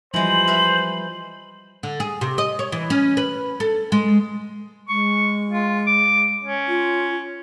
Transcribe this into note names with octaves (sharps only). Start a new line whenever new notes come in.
E3 F3 G3 G#3 B3 C5 F#7
B4 E5 B5
D3
G#4
C3
D#5
C#5
E3
C#4
B4
A4
G#3
G#3 C#6
F4
D6
C#4
F4